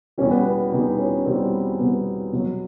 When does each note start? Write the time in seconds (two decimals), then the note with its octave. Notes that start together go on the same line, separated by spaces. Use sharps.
0.18 E2 B2 G3 C#4
0.31 B3
0.45 B3
0.72 E2 B2 G3 D#4
0.98 C#4
1.25 E2 B2 G3 C4
1.79 E2 B2 G3 B3
2.33 B2 F#3